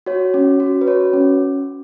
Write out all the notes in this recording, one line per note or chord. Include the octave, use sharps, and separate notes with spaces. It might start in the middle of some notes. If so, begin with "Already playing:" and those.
F#4 C#5
C#4
F#4
B4
F#4 C#5
C#4